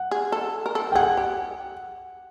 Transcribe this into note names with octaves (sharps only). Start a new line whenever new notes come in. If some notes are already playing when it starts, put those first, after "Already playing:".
Already playing: F#5
G#4
A4
A#4
A4
G5
G#4 F#5
G4